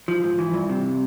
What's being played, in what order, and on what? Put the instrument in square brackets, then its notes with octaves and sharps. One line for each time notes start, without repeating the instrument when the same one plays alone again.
[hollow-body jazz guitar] F3
G#2
E3
G2
C3